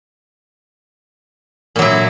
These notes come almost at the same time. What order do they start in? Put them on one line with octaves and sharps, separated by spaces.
A#2 F#3 E4